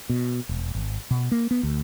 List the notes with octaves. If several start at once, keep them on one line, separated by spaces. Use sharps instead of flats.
B2
E1
G#1
B2
A#3
B3
D2